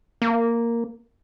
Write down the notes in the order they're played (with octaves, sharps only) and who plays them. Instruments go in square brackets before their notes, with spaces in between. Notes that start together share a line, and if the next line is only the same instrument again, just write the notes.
[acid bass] A#3